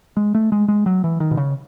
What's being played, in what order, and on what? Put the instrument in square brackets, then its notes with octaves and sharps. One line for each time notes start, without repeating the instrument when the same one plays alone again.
[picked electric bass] G#3
A3
G#3
G#3
F#3
E3
D#3
B2
C#3